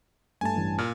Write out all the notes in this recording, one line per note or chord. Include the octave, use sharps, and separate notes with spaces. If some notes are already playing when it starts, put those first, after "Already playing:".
G2 A3 G#5 A5
A1 G2
A#2 F6